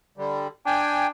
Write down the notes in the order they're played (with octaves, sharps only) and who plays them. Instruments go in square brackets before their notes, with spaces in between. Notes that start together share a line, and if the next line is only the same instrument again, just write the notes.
[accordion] D3 G3
[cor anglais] D4 [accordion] G5 G#5